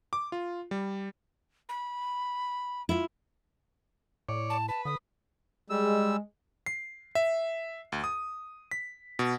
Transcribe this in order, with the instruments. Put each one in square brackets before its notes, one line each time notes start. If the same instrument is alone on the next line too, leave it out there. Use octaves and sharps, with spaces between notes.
[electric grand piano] D6
F4
G3
[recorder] B5
[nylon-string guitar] E4 F4
[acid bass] A2 [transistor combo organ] C#5 D5
[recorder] A5
[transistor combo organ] B4 [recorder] A5
[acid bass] D3 [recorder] D#6
[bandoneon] G3 E6 [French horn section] G#3
[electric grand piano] C7
E5
D2
D#6
B6
B2